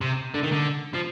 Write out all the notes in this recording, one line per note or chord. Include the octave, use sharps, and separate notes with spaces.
C3
D3
D#3
D3
F3